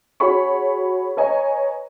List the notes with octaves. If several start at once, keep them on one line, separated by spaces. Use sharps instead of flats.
F#4 G#4 C#5 B5 C#6
B4 C#5 D#5 G#5 A#5